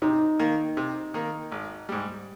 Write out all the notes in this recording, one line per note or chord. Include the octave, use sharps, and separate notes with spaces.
C3 D#4
D#3 A#3
C3
D#3 A#3
G#1
G#2 G3